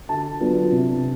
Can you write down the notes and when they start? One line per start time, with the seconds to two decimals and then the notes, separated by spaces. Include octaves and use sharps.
0.09 D3 A5
0.40 F#3 B3 D4 F4
0.72 C3